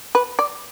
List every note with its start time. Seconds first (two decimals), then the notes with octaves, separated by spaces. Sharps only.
0.15 B4
0.39 D5